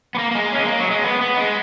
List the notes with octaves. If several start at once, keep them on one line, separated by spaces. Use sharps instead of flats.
B3
A#3
A#3
G#3
C#4
G#3
A#3
F#3
G#3
B3
B3
G#3